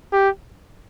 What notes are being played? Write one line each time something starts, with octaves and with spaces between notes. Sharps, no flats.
G4